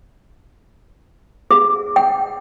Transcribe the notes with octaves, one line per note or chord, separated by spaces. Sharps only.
G#4
G5